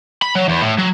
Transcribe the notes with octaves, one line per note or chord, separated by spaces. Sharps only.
B5
F#3
E2
A2
F#3